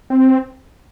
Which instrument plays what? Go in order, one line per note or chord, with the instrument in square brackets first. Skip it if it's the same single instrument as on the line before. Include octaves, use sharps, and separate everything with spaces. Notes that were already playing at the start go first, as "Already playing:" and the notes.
[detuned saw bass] C4